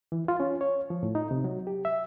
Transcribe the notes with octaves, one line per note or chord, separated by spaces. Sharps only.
E3
F4
C#4
C#5
F3
A2
D#4
C3
F#3
G4
E5